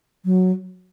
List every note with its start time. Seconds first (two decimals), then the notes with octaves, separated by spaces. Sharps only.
0.25 F#3